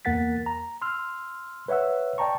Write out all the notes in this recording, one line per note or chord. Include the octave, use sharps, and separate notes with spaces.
E2 A#3 A#4 F#5 A6 B6
A#5
C6 E6 F6
B4 C#5 E5 F#5 E6
D5 G5 A5 A#5 C#6